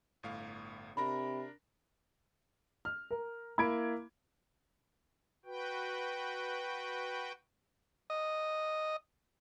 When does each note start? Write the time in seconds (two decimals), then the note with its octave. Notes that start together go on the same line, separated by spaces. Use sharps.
0.23 G1 A2 F5
0.97 C3 D4 A#4 B5 A#6
2.85 F6
3.11 A#4
3.58 A#3 E4 B5 G#6 D7
5.45 F#4 B4 G5
8.10 D#5